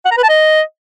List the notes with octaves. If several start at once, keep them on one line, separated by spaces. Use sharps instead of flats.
F#5
A#5
B4
A5
D#5